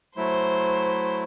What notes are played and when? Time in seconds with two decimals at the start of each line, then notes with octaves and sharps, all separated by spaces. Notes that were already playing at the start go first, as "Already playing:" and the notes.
0.17 F#3 A3 E4 C5